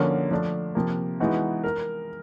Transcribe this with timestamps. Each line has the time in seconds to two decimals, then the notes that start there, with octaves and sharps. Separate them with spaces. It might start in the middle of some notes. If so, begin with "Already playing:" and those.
Already playing: D3 F3 A#3 C#4 F#4
0.31 F3 A3 D4
0.75 C3 F3 A#3
1.20 E3 G#3 B3 D#4 F#4
1.64 A#4